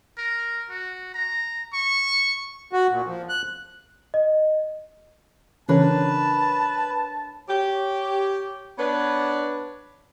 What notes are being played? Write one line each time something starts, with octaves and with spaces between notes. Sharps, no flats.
A#4
F#4
A#5
C#6
F#4
A#2
F3
F#6
D#5
C#3 E3 C#4 D4 A#4 B4 C#5 A5
G4 C#5
B3 D4 B4 C#5